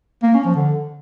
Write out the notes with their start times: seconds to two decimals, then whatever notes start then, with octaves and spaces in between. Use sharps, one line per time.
0.23 A#3
0.34 C#4
0.45 F3
0.55 D3